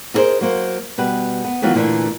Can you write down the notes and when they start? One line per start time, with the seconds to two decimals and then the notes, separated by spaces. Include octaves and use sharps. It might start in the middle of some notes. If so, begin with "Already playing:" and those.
0.14 D#4 E4 G#4 A#4 C5
0.41 F#3 A#3 C5
0.98 B2 G3 B4
1.44 B3
1.62 D#3 E3 F#3 B3 F4
1.75 A#2 D3 E3 A3 D4